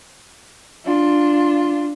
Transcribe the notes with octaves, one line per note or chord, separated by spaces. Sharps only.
D4 F4